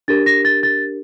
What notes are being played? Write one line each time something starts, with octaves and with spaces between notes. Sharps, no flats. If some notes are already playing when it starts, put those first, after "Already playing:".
D4 G4 A#4 A6
A#6
A6
A6